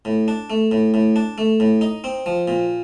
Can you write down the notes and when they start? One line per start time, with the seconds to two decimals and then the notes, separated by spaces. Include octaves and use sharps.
0.05 A2
0.28 D4
0.50 A3
0.71 A2
0.94 A2
1.16 D4
1.38 A3
1.60 A2
1.81 D#4
2.04 C4
2.26 F3
2.48 A#2